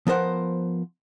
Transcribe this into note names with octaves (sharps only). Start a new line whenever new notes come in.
F3 B3 A#4 C5 F#5